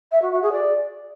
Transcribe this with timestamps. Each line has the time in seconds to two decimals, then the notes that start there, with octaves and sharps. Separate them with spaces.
0.12 E5
0.22 F#4
0.32 F#4
0.42 G#4
0.52 D5